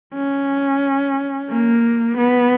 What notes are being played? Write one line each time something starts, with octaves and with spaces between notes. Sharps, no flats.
C#4
A#3
B3